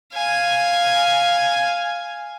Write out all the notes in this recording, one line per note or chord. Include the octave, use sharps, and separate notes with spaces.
F5 G#5